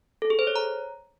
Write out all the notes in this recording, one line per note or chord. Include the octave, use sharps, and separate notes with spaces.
A4
G#4
C5
C#5
A#5